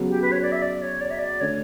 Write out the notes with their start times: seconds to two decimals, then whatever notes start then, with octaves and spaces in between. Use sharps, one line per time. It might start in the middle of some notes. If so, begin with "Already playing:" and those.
Already playing: C#3 F#3 B3
0.09 G4
0.22 B4
0.32 C#5
0.42 D5
0.52 E5
0.62 D5
0.82 C#5
1.01 D5
1.11 E5
1.19 D5
1.41 D3 A3 D4 C#5